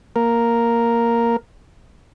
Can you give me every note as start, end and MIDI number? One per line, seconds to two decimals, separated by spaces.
0.16 1.36 58
0.16 1.36 70